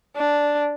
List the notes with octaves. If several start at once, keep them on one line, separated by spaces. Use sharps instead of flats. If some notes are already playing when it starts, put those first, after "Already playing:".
D4